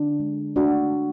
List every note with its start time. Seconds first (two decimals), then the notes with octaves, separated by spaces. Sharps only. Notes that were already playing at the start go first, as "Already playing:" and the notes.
Already playing: D3 D4
0.20 G#3
0.56 A3 D4 F#4
0.92 A3